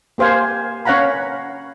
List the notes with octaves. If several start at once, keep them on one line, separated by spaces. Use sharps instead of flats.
A#3 G4 C5 F5 G#5
C#4 C#5 F5 F#5 A#5 B5